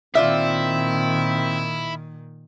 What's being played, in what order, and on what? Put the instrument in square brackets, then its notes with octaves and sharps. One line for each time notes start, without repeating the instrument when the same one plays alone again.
[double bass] A#2 D#3 [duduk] C4 [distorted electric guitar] E4 [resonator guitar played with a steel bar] F4 D5 E5